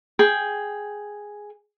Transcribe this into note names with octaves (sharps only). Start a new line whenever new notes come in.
G#4 G5